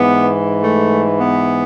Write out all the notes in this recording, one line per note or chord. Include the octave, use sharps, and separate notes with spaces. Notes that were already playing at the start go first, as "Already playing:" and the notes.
Already playing: G#2 E3 B3
A3
B3